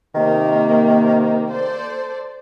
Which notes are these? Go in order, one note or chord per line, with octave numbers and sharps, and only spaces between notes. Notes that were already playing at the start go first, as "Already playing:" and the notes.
C3 D#3 A#3
A4 C5 D5